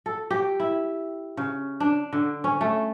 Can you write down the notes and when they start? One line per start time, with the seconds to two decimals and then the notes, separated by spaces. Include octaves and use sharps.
0.06 A4
0.31 G4
0.60 E4
1.37 C#3
1.80 D4
2.13 D3
2.44 C#4
2.61 A3